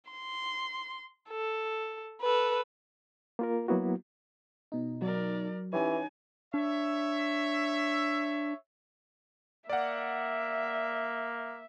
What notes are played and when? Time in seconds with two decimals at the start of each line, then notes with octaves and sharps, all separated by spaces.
0.11 C6
1.30 A4
2.21 A4 B4
3.39 A#3 F4 A#4
3.68 F#3 A#3 B3 E4 F#4
4.72 B2 D#4
5.02 F#3 A#4 D5
5.73 E3 C#4 D#4 G4 C#5 G#5
6.54 D4 C#5 E5
9.69 A#3 D5 E5 F#5